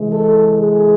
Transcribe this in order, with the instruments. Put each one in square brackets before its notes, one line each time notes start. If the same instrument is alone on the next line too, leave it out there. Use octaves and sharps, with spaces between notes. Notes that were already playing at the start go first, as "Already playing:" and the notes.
Already playing: [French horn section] C3 E3 G#3
A4
G#4